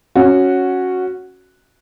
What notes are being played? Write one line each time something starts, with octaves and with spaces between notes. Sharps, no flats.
C#4 F#4